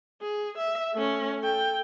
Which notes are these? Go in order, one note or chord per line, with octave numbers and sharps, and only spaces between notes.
G#4
E5
A3 C#4
A4 G5